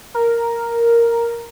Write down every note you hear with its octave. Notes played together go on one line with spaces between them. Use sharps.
A#4